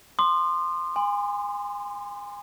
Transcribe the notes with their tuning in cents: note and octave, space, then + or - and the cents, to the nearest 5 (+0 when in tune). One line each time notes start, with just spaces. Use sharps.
C6 +0 D#6 -40
G#5 -30 C6 -30